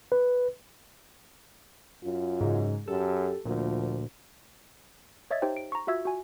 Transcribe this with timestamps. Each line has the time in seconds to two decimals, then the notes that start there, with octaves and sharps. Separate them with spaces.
0.12 B4
2.04 F#2 F4
2.41 G#2 C#3
2.88 F#2 G4 A4
3.45 D2 A#2 F3
5.31 C#5 D#5 E5 G#6 A6
5.42 D#4 G4 C5 G5
5.57 D7
5.72 A#5 C#6
5.87 F4 F#4 E5 E6 G#6
6.05 F#4 G#5